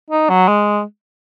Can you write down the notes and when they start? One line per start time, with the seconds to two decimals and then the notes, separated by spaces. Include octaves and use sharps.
0.10 D#4
0.29 F#3
0.48 G#3